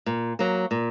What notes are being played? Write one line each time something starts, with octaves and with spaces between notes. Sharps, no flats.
A#2
F#3 A#3
A#2